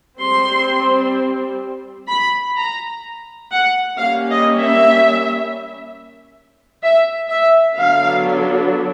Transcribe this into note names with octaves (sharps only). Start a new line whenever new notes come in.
G3 C4 C6
B5
A#5
F#5
G3 A#3 C#4 F5
D#5
E5
E5
E5
D3 F#3 B3 D4 F5